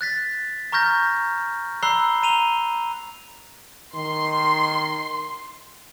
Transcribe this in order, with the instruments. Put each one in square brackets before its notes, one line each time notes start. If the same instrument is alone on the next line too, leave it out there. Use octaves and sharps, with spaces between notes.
[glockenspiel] F#6 A6 B6
A#5 C#6 F6 G6 A#6
A#5 B5 E6 F#6 C7 G7
A#5 D#7 F7 G7
[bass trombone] D#3 [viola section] C6